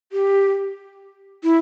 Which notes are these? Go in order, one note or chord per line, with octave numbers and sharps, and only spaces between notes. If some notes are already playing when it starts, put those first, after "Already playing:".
G4
E4